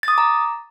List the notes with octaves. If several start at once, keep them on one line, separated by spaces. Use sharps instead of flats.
A#5 D6 D#6 A6